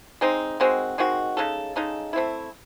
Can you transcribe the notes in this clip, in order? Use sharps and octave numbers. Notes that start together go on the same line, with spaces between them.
G#3 C4 D#4
D#3 G#3 C4 F#4
D#3 G#3 C4 F#4
C#3 G#3 D#4 A4
C#3 G#3 D#4 A4
A3 C4 E4